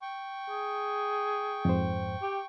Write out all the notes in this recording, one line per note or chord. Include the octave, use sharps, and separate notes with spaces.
G5 C#6
G#4
F2 G#2 C5
G4